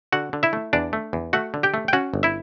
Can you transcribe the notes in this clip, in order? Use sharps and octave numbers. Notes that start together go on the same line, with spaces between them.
D3 F#4 F#5
D3
E4 E5
A3
E2 D4 D5
A3
E2
A3 F#4 F#5
D3
G4 G5
A3
G5
C#4 F#4 F#5
G1
E4 E5